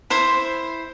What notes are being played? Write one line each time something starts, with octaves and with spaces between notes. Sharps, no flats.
E4 C5 C6